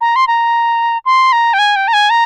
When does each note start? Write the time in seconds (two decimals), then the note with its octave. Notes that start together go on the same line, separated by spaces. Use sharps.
0.01 A#5
0.16 C6
0.27 A#5
1.05 C6
1.32 A#5
1.53 G5
1.59 G#5
1.76 G5
1.88 A#5
1.93 G#5
2.10 A#5